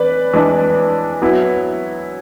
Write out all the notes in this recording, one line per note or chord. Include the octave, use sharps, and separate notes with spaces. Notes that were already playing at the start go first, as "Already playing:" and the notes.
Already playing: E3 B4 D5
E3 G#3 D4
F#3 B3 E4